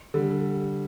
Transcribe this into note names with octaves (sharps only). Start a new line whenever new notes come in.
D3 G3